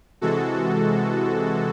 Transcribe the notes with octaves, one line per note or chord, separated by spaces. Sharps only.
C3 E3 G#3 F#4 A4